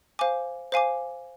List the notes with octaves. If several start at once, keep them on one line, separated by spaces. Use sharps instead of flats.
C5 F5 G#5 D6
C5 F5 G#5 D6